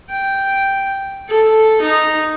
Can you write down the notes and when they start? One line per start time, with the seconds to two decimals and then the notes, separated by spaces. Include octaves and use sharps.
0.10 G5
1.29 A4
1.81 D#4